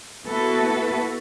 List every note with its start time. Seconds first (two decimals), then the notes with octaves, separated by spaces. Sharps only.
0.25 A#3 B3 E4 F#4 A4 B4